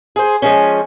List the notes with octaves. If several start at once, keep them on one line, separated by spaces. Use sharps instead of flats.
G#4 C5
F3 G#3 C#4